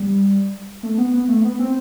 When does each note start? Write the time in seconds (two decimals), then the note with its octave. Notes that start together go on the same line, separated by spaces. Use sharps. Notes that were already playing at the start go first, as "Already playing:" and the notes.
Already playing: G3
0.83 A3
0.98 B3
1.13 B3
1.28 A3
1.44 B3
1.59 C4